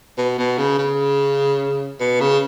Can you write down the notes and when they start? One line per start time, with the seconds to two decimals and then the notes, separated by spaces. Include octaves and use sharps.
0.17 B2
0.38 B2
0.58 C#3
0.78 C#3
2.00 B2
2.20 C#3